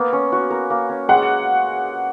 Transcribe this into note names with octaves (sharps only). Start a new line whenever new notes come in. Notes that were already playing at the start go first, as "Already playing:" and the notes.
Already playing: A#3 B3
C#4
F#4
A#4
A#3
C#4
G#3 F#5